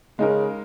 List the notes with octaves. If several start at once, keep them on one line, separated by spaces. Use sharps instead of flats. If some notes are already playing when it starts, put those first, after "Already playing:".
C#3 G#3 D#4 A#4